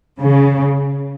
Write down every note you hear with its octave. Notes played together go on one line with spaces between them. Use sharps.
C#3